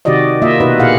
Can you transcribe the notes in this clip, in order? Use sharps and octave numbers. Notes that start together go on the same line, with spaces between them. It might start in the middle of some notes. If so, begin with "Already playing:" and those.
C3 D#3 F#4 G4 D5 D#5
A#3 F4 D#5 E5
B2 D#4 F#4 B4 D#5
A#2 E4 G4 G#4 F5 F#5